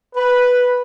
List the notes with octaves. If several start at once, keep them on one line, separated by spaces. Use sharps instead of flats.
B4